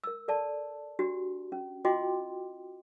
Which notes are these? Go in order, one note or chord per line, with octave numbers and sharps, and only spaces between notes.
A#4 E6
A4 D5 A5
D4 F#4 G4
C#4
F4 F#4 D#5 G5 C6 D6